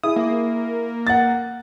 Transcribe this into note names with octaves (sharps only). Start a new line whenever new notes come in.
E4 G#4 D#6
A#3
F#5 A6